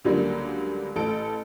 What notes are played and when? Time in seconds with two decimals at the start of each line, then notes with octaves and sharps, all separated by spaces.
0.04 C#2 D3 F#3 G3 A#3
0.96 A1 A4 D7